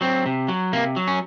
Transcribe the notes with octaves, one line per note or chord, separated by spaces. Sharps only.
F#3 C4
C3
F#3
C3 A#3
F#3
C#4